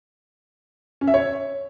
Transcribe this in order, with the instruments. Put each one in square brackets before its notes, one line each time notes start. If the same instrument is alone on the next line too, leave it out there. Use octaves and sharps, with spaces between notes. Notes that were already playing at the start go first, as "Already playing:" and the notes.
[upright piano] C#4
E5
C#5